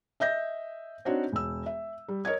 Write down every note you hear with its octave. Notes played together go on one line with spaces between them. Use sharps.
D#5 E5 G6 A#6
C4 D4 D#4 F#4 C5 C#5
E1 E6
E5
G3
A#4 C#5 D#5 G#6